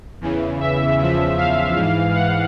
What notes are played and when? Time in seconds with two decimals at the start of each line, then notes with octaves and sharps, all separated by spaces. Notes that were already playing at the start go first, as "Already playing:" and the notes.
0.21 E2 C#3 E3
0.60 E5
0.99 E2 C#3 F3
1.38 F5
1.76 G#2 E3
2.15 F#5